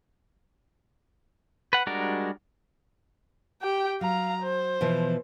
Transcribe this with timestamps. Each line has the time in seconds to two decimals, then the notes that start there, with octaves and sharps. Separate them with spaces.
1.73 B4 F#5
1.87 G3 G#3 D4 F#4 A#4
3.62 G4 G5
4.01 F#3 F5 A#5
4.43 C5
4.81 B2 E3 F3